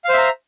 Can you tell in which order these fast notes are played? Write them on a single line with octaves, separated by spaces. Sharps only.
F5 C5 E5 A#5